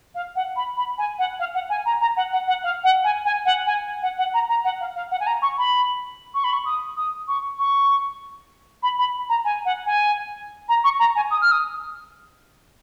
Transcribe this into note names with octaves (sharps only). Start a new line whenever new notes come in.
F5
F#5
B5
B5
G#5
F#5
F5
F#5
G#5
A#5
A#5
F#5
F#5
F#5
F5
F#5
G#5
G#5
F#5
G#5
F#5
F#5
A#5
A#5
F#5
F5
F5
F#5
G#5
A#5
C#6
B5
C#6
B5
C#6
D#6
D#6
C#6
C#6
B5
B5
A#5
G#5
F#5
G#5
A#5
C#6
A#5
G#5
D#6
F6
D#6